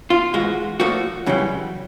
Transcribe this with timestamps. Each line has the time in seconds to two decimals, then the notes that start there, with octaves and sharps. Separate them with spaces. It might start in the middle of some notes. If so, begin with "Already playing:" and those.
0.10 F4
0.34 G#2 E3 G#3 F#4
0.80 A#2 F3 A3 F#4
1.26 F#2 C#3 E3 G3